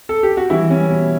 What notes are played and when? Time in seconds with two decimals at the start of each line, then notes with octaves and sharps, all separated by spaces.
0.09 A4
0.23 G4
0.37 F#4
0.50 E3 G3 E4
0.70 G3 C#4
0.90 B2